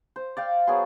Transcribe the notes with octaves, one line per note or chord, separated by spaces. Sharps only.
C5
D5 F5 G5
F#3 B3 G#4 C6